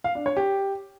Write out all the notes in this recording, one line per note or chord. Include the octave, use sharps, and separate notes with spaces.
F5
D4
C#5
G4